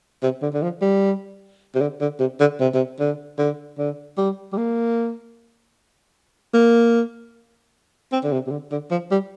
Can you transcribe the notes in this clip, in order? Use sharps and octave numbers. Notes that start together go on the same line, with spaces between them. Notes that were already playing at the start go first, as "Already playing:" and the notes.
C3
D3
D3
F3
G3
C3
D3
D3
C3
D3
C3
C3
D3
D3
D3
G3
G3
A#3
A#3
C4
D3
C3
C3
D3
D3
F3
G3